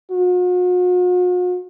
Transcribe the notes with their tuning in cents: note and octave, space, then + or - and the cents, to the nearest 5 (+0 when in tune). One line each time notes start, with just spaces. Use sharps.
F#4 -45